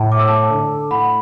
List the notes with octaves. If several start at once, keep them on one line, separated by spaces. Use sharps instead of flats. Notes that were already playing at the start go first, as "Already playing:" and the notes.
Already playing: A2
D6
E6
A5 D6
D3
A2 F#5 B5